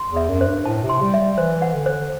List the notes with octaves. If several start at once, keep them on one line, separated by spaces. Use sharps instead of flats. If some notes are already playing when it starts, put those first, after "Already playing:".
Already playing: C6
E2
E5
F#2
C5
G2
A2 A5
C3
C6
G3
E5
G3
E3 C5
F#5
D3
C5